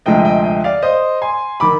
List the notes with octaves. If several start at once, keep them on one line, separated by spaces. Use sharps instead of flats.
D2 C3 F3 G#3 D#5 G5
D#5 G5
D#5 G5
D5 F5
C5 D#5
G#5 C6
D#3 B5 D6